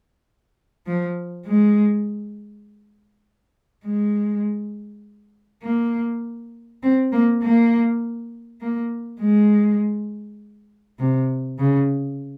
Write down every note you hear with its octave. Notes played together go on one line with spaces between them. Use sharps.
F3
G#3
G#3
A#3
C4
A#3
A#3
A#3
G#3
C3
C#3